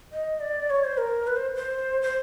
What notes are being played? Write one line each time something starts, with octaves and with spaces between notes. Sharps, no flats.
D#5
D5
C#5
C5
A#4
B4
C5
C5
C5